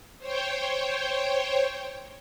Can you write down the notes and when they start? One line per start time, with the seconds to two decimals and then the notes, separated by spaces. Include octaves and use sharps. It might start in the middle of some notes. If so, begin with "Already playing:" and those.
0.18 C5 C#5 G5